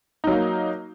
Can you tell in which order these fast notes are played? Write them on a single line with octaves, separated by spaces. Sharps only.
D#4 F#3 A#3